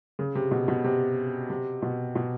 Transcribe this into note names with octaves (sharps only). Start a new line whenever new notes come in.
C#3
C3
B2
B2
C3
C3
B2
B2